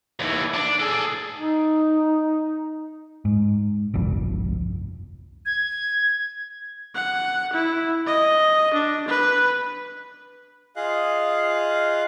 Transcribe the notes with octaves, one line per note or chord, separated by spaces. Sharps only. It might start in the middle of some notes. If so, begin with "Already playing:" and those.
D#2 E3
D4
G#4 A4
D#4
G#2
G1 C2 F2
G#6
F#5
E4
D#5
D4
B4
F4 G#4 D#5 F5 F#6